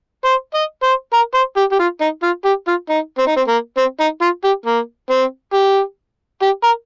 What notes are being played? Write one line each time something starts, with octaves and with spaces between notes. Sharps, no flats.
C5
D#5
C5
A#4
C5
G4
G4
F4
D#4
F4
G4
F4
D#4
C4
D#4
C4
A#3
C4
D#4
F4
G4
A#3
C4
G4
G4
A#4